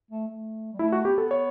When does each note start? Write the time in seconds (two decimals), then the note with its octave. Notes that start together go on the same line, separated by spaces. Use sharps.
0.11 A3
0.28 A3
0.73 G3
0.79 A3 E4
0.92 F#4
1.05 B3 G4
1.18 A4
1.31 C#5